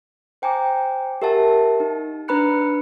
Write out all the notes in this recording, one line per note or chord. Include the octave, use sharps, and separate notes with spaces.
C5 G5 G#5 A#5 D6
G4 A#4 E5 F#5 A5
D#4
D4 B4 A#5 B5 F#6 C#7